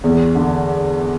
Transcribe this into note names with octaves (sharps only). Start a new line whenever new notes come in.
E2
D3